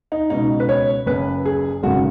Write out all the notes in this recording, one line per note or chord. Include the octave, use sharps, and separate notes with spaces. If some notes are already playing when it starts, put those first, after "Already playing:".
D#4
C#2 B2 D#4
B4
C#5
F#1 F#2 C#3 B4
G#4
G#1 F#2 C#3 F#4